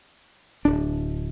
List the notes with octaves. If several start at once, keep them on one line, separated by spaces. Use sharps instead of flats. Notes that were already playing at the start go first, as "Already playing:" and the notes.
D1 D4